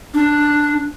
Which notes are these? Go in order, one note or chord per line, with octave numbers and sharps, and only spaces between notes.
D4